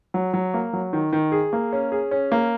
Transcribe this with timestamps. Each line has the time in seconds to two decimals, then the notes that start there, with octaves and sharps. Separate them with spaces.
0.14 F#3
0.33 F#3
0.54 A#3
0.73 F#3
0.93 D#3
1.13 D#3
1.32 G#4
1.53 A#3
1.73 C#4
1.92 G#4
2.11 C#4
2.32 A#3